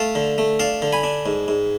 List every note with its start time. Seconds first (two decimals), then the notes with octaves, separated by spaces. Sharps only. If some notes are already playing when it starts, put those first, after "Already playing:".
Already playing: A3 F5 A5
0.15 D3
0.38 A3
0.59 D4 F5 A5
0.82 D3
0.93 G#5 B5
1.04 D4
1.26 G#2
1.48 G#2